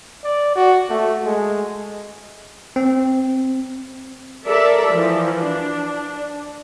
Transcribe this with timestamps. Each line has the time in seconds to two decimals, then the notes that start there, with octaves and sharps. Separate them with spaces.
0.24 D5
0.55 F#4
0.90 A3
1.25 G#3
2.76 C4
4.45 A4 A#4 D5 E5
4.92 E3 F3
5.46 D4